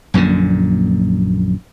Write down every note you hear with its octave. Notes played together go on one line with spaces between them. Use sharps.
A#1 F#2 A#2 D3